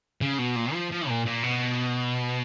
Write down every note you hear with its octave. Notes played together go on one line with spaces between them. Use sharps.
C#3
B2
A#2
F3
F3
A#2
A#2
B2